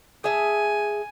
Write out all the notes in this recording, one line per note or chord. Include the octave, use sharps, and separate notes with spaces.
G#4 E5 G#5 A5